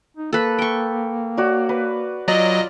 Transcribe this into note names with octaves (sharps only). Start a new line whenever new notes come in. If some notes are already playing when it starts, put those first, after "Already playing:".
D#4
A#3 A4 B4
G5 C#6
F#4 C#5 D5
B4
F#3 F4 D5 D#5